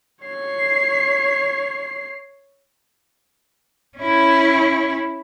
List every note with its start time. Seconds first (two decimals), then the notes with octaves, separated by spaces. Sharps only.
0.25 C#5 C7
3.98 C#4 E4